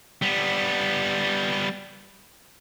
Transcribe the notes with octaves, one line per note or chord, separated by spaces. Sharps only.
G3 B3